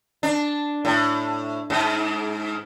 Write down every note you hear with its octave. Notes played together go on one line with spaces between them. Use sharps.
D4
A2
G#2